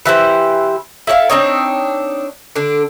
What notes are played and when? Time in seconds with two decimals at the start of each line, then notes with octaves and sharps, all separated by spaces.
0.06 E3 E4 G4 C5
1.07 E4 A4 C#5 F5
1.30 C4 D4 D#4 C#5
2.56 D3 D4